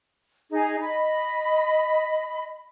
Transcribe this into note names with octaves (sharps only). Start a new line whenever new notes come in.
D#4 G#4
D#5 B5